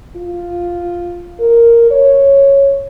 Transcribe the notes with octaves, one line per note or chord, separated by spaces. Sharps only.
F4
A#4
C#5